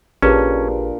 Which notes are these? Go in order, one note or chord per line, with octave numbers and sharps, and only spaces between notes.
A1 A#2 C#4 D4 G4 G#4 B4